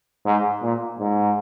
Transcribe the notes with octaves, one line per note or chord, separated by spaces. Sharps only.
G#2
A#2
G#2